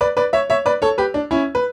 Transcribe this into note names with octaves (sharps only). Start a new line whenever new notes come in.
B4 D5
B4 D5
C#5 E5
C#5 E5
B4 D5
A4 C#5
G4 B4
D4
C#4 E4
B4